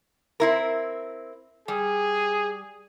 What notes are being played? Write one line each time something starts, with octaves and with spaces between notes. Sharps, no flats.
C4 E4 A#4
G3 G#4